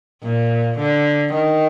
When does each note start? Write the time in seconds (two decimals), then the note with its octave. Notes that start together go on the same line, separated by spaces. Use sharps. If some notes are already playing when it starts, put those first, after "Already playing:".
0.22 A#2
0.78 D3
1.33 D#3